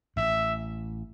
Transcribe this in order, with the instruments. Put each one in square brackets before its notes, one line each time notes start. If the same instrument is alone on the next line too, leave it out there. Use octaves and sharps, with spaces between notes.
[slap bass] A1 A2 [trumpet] E5